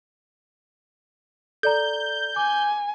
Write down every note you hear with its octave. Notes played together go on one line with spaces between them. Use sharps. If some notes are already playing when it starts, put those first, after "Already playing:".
A4 D5 A#5 G6
G#5 D6